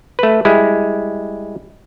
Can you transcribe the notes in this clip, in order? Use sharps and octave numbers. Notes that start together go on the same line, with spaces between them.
A3 B4
G3 G#3 E4